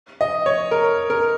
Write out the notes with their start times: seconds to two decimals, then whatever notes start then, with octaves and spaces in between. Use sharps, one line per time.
0.21 D#5
0.46 C#5
0.71 A#4
1.10 A#4